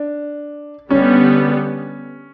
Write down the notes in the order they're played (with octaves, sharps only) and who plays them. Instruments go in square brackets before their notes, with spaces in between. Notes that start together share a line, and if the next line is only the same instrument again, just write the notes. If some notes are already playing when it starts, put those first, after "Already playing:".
Already playing: [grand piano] D4
[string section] D3 G3 B3 [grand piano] C#4